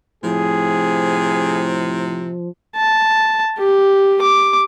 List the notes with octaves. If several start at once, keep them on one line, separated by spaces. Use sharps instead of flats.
A2 C3 F3 G#4
A5
G4
D6